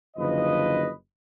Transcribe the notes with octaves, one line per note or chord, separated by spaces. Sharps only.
F#1 D3 F3 B4 D#5